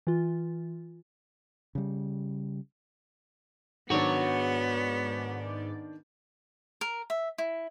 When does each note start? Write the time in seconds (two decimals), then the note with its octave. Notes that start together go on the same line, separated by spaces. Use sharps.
0.07 E3 F4
1.75 C#3 G3
3.90 G#2 D#3 B3 D4 F#4 C#5 D5
6.81 A#4
7.10 E5
7.38 E4